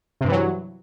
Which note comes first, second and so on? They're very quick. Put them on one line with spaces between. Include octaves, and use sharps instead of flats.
C3 G2 E3 F#3